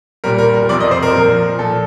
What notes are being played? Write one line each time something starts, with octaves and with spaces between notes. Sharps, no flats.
A#2 G3 A#4
A#4
A#4
F2 C3 F3 D5
D#5
C5
A#4
A#2 F3
A#2 F3 A4